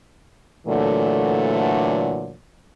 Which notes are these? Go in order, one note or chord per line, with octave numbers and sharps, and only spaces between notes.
A#2 D3 E3 F#3 A3